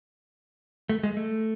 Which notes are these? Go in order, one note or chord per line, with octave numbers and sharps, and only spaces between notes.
A3
G#3
A3